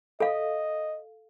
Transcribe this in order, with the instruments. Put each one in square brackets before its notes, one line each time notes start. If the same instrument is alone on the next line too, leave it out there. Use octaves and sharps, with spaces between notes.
[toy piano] A4 F5 [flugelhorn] D#5